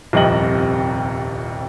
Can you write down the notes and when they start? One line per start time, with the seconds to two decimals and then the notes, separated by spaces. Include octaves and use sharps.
0.13 D#1 C2 F2 C3 D#5 F#7